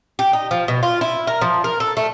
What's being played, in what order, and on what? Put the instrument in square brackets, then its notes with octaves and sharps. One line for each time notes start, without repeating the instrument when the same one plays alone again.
[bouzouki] G4
D#4
F3
B2
F4
E4
A#4
F3
A#4
A4
A3